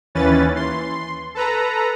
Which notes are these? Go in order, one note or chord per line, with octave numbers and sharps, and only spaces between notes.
D#2 E3 C#4 B4 A6
C6
A4 B4 A#5